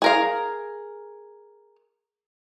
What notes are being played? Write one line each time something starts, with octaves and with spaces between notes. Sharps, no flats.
G#4 A#4 F5